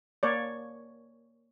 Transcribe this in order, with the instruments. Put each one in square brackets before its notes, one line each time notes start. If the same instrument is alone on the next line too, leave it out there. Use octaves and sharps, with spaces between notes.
[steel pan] A#3 C#5 D5